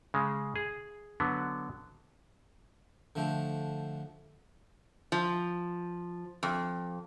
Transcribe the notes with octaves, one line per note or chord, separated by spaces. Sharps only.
C#3 G#3
G#4
D3 F#3 B3
D3 F3 A3 G5
F3
F2